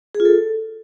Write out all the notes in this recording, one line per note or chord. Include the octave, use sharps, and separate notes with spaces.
G#4
F4
A4